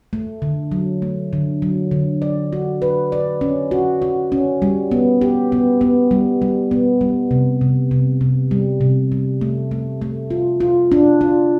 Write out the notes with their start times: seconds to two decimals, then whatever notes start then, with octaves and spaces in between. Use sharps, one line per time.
0.13 A3
0.42 D3
0.72 F#3
1.02 A3
1.33 D3
1.62 F#3
1.91 D3
2.22 D5
2.53 F#4
2.82 B4
3.12 D5
3.41 C#4
3.71 F#4
4.02 F#4
4.32 C#4
4.62 G3
4.91 B3
5.21 G4
5.52 B3
5.81 B3
6.11 G3
6.42 G3
6.71 B3
7.01 G3
7.31 C3
7.61 C3
7.91 C3
8.21 C3
8.51 G3
8.81 C3
9.12 G3
9.41 A3
9.71 A3
10.02 A3
10.31 F4
10.60 F4
10.92 D4
11.21 F4